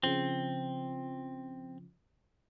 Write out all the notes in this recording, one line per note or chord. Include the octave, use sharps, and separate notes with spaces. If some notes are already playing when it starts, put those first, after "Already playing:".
C#3 F3 C4